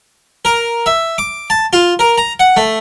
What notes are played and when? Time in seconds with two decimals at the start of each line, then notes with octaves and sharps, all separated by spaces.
0.45 A#4
0.86 E5
1.18 D6
1.50 A5
1.73 F4
1.99 A#4
2.18 A#5
2.40 F#5
2.56 A3